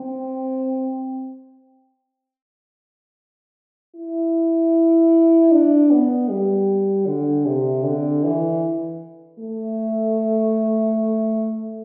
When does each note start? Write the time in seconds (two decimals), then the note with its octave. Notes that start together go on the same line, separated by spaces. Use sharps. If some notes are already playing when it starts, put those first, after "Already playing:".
Already playing: C4
3.96 E4
5.51 D4
5.91 B3
6.29 G3
7.06 D3
7.45 C3
7.84 D3
8.24 E3
9.39 A3